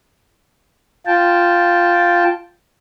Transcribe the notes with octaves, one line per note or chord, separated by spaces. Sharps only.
F4 G5 A5